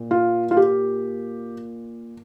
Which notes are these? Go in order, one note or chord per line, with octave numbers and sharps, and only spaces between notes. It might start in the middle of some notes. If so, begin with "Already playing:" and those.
Already playing: A#2
F4
F4
G4